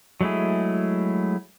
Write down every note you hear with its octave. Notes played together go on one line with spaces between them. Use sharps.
F#3 G#3 A3 E4 G#4